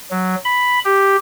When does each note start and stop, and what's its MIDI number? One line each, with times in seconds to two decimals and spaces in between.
0.11 0.35 54
0.45 0.79 83
0.85 1.16 67